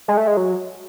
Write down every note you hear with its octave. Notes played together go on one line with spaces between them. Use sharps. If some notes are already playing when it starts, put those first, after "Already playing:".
G#3
A3
G#3
F#3